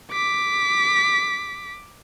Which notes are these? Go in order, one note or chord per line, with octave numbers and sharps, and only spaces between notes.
D6 B6